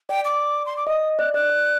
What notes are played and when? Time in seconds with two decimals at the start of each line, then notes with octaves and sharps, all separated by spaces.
0.09 D5 G5
0.25 D6
0.66 C6
0.77 D6
0.87 D#5 D#6
1.19 D5 F#6
1.34 D5 F#6
1.50 D5